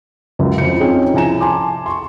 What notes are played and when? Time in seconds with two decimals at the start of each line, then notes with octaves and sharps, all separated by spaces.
0.39 C#2 F#2
0.58 F2 C#7
0.80 C4 C#4 D#4 F4 G#4 C#5
1.14 C2 F3 G#5 A#5 E7
1.40 G#5 A5 C6 D6
1.86 C6 C#6